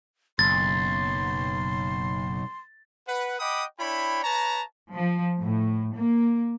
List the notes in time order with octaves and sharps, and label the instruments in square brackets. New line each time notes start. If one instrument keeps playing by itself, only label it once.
[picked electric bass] F#1 [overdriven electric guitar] B1 [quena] C6 [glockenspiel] A6
[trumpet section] B4 F#5
D#5 F#5 G5 B5 D6 D#6
D4 E4 C#5 G5 B5
B4 C#5 A5 A#5
[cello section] F3
A2
A#3